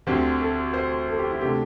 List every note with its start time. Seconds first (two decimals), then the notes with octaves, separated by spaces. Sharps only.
0.07 D2 D3 C4 G4
0.40 A4
0.74 C5
1.08 A4
1.19 G4
1.31 E4
1.41 C3 A3 D4 G4